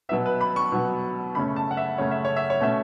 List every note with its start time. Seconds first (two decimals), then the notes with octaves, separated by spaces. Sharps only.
0.09 B2 F#3 B3 E5
0.26 B4
0.41 B5
0.56 C#6
0.72 B2 F#3 B3
1.35 F#2 C#3 A3 C#4 B5
1.56 A5
1.71 F#5
1.77 E5
1.98 F#2 C#3 A3 C#4 C#5
2.11 E5
2.25 C#5
2.37 E5
2.50 C#5
2.60 B2 A3 C#4 E5